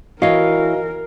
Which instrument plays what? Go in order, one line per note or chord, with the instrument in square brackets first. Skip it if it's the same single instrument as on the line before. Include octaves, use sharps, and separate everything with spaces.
[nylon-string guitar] E3 C#5 [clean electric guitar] F#4 D#5 F5 [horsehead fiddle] A#4